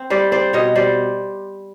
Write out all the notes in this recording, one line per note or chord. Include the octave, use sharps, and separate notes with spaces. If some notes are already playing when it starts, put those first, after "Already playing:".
Already playing: C4
G3 C5 D5
C4 C5 D5
B2 C#5 D#5
G3 C5 D5